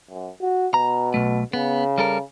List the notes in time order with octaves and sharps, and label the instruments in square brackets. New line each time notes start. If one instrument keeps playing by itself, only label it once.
[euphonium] F#2
F#4
[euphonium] B2 [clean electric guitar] A#5
[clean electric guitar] B1 A3
[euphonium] C#3 [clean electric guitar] B3
[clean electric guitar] G3 A4 A#4